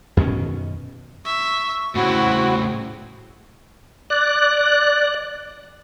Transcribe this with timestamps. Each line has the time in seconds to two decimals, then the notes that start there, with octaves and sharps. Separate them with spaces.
0.17 F#2 B2 D#3 C#4
1.25 E5 C#6
1.95 A2 C#3 C4 E4 F#4 B5
4.10 D5 F#6